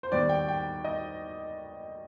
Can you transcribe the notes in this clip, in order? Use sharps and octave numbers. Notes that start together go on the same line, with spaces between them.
C5
D#2 D#3 G3 B3 D5
G5
G5
D#5